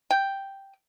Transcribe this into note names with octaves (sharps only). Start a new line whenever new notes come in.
G5